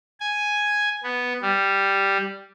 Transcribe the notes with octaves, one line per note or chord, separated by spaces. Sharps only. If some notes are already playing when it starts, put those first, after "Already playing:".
G#5
B3
G3